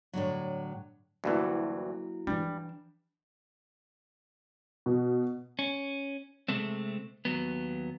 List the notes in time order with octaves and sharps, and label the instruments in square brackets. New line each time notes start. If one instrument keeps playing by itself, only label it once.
[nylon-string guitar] A2 D3 F#3
[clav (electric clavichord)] D2 G2 E3 [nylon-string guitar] F#3 A#3 E4
[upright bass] E3 D4 [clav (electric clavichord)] G3
[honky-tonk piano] B2
[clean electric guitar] C#4
C3 G#3 A3 C4
D#2 F#3 B3